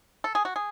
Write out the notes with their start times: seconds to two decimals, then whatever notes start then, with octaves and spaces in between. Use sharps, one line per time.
0.24 A4
0.35 G#4
0.45 F#4
0.56 G#4